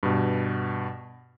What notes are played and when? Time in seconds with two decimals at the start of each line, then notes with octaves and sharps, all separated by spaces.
0.03 G2 B2